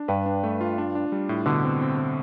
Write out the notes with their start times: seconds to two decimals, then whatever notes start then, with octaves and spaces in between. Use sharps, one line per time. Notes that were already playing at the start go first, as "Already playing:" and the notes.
Already playing: D4
0.08 G2 B4
0.26 D4
0.43 A3
0.61 F4
0.78 D4
0.95 D4
1.12 G3
1.29 A2
1.46 B2 D3
1.63 C4
1.81 C4
1.97 C4